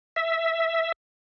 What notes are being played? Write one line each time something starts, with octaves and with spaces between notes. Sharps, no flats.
E5